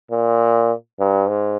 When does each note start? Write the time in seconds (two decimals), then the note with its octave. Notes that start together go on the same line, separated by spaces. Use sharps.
0.11 A#2
0.99 G2
1.29 G#2